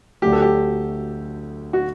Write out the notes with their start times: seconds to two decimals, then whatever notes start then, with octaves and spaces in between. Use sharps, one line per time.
0.22 D2 D3 F#3 A3 G4
0.32 A4
0.42 G4
1.73 F#4